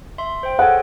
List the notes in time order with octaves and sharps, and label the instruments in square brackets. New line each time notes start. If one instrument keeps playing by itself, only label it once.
[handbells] E5 C6
C5 G5
[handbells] G#4 A4 C#5 [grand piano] F#5